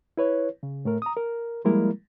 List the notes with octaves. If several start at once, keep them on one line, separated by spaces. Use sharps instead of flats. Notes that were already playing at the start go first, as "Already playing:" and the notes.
E4 B4 C#5
C#3
A2 A3 A#4
A#5 D#6
A#4
F3 G3 G#3 A#3 E4 A#4